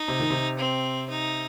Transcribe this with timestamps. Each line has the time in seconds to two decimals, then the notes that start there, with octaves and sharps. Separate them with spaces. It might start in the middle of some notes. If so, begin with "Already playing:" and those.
Already playing: D#4
0.08 C3
0.20 D#3
0.30 C3
0.59 C4
1.09 D#4